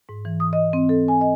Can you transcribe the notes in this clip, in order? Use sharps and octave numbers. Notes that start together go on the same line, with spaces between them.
G#2
E3
D#6
D#5
C4
A4
G#5
D#5